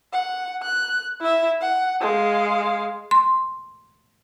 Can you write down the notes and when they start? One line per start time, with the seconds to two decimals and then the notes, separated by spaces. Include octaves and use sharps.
0.13 F#5
0.63 F#6
1.21 E4 E5
1.61 F#5
2.01 G#3 F5
3.11 C6